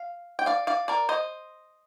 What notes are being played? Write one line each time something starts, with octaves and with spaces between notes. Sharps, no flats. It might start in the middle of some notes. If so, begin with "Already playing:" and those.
Already playing: F5
G5
D5 F5
D5 F5
A#4 D5
C5 D#5